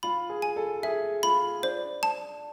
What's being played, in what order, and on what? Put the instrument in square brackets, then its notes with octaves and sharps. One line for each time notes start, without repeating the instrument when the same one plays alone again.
[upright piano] F4 [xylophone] B5
[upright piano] G#4
[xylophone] G#5
[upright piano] A4
[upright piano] G#4 [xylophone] E5
[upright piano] F4 [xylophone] B5
[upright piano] D4 [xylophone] C5
[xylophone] A5